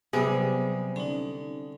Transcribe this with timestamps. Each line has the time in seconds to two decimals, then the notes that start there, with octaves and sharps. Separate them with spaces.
0.13 C3 F#3 G3 B3 G#4 C5
0.96 D3 C#4 D#4